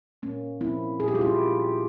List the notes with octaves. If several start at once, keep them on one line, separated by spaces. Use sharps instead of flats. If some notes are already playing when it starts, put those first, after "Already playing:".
A#2 A#3 C#4
F3 A#3 C4 E4
A#2 G#4
G4
F4
E4 G4